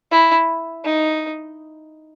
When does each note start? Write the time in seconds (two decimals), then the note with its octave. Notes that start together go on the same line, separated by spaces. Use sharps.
0.11 E4
0.85 D#4